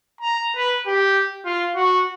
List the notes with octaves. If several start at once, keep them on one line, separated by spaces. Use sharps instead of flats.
A#5
B4
G4
F4
F#4